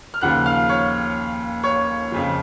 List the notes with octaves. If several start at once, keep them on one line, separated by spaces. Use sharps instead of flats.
F6
D#2 C#3 F3 F#5 F#6
F5 F6
C#5 C#6
C#5 C#6
F2 C#3 F3